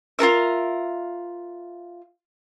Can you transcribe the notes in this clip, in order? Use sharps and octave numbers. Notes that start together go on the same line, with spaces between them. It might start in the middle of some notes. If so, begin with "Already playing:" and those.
F4 A4 A#4 E5